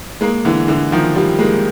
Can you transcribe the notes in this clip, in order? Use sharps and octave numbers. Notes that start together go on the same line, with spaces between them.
G#3 A#3
D3 E3
D3 E3
D#3 F3
F3 G3
G#3 A#3